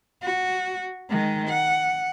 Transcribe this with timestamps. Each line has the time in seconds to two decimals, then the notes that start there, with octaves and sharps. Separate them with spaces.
0.22 F#4
1.10 D#3 G#3
1.49 F#5